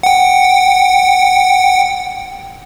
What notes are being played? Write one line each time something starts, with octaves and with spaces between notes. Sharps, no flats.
F#5 G5